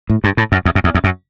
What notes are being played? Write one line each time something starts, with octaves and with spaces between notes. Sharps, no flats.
A2
G2
A2
F#2
E2
F#2
E2
E2
F#2